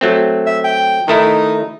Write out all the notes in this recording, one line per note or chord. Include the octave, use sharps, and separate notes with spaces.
F#3 A3 C4
E5
G5
D#3 A3 D#4 E4